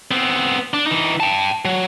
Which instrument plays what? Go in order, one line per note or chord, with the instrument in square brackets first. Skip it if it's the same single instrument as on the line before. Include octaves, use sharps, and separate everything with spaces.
[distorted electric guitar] B3 C4
D4
E3 D#4
G5 A5
F#3